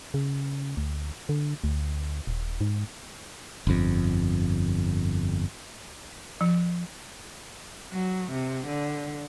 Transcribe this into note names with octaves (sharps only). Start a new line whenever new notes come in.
C#3
D2
D3
D2
D#1
G#2
G1 F2
F3
F#3
C3
D3